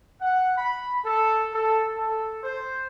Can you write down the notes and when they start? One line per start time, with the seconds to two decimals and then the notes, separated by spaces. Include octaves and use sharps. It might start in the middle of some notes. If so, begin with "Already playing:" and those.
0.22 F#5
0.57 B5
1.05 A4
1.53 A4
1.97 A4
2.43 C5